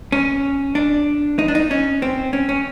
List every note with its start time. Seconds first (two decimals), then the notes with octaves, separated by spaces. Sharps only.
0.12 C#4
0.75 D4
1.39 D#4
1.48 D4
1.55 D#4
1.71 C#4
2.02 C4
2.33 C#4
2.49 C#4